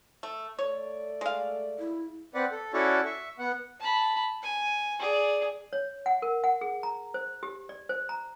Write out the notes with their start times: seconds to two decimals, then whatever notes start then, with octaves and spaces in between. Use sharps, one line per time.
0.23 A3
0.59 A3 C#5 D5
1.21 G#3 F5
1.79 E4
2.34 C4 B4 D5 F#5
2.51 A4
2.74 C#4 E4 F#4 A4 C#5 D5
3.05 E5 C#6
3.39 B3 F#5
3.80 A5 B5
4.43 G#5
5.00 G#4 D5
5.73 C#5
6.06 F#5
6.22 A#4
6.44 F#5
6.61 G#4
6.83 A#5
7.14 C5
7.43 G4
7.69 D5
7.89 C5
8.09 A#5